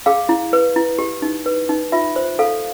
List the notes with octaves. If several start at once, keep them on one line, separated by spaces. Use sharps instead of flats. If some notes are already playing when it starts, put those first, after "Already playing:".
G#4 F5
E4
B4
E4
G4
D#4
B4
D#4
F4 E5
C5
A4 F5